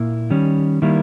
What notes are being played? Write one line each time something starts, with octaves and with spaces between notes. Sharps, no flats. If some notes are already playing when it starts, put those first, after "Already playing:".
Already playing: A#2 A#3 E4
D#3 G3 C#4
D#3 G3 A#3 E4